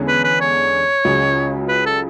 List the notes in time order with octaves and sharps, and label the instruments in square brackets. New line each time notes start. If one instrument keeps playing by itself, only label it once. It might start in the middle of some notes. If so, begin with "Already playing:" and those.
Already playing: [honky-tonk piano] E2 D3 G#3 C#4 G#4
[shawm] B4
B4
C#5
[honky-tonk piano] C#2 C#3 F#3
[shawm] B4
A4